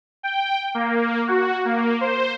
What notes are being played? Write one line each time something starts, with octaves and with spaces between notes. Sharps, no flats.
G5
A#3
F#4
A#3
C5